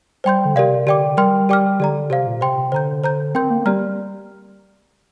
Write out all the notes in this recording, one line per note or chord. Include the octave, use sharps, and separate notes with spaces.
G3 C5 G5 C6 G6
D3
C3 G4 A#4 D5 F5
D3 G4 D5 G5 D6
G3 A#4 G5 C6 F6
G4 D5 G5 D6 F6
D3 G4 D5 A#5
C3 G4 C5 F5
A#2
C3 C5 G5 C6
C3
D3 C5 A#5 G6
C5 A#5 G6
C4 A#4 G5 C6 G6
A#3
A#3
G3 G4 D5 A#5 F6